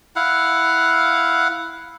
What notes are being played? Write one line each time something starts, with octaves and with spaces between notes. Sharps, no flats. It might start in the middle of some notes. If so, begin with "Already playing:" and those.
E4 F5 F#5